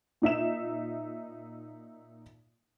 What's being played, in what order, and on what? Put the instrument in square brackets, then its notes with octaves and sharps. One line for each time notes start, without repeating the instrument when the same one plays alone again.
[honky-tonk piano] A#2 D#4 E5 E7